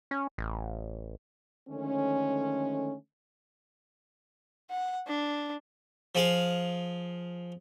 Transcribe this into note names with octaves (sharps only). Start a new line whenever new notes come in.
C#4
A1
D3 D#3 F3 G#3 A3 C#4
F#5
D4
F3 G#4 F5